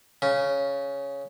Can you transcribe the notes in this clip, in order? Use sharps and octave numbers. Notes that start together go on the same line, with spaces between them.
C#3